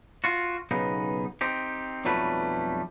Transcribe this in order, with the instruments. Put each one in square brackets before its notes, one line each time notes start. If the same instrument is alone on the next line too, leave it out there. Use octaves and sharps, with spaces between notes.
[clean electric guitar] F4 F#4
B1 C#3 B3 D#4
C4 D#4 G4
B1 F2 F#3 G3 A3 B4